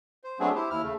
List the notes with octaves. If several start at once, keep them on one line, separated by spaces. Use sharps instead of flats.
C5
F#3 A3 B3 C4 D4 G#4
E4 G4 C5
D#2 E4 F6
C#3 A3